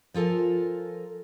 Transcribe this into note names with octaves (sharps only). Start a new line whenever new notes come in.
F3 F4 A4 A#4 G#5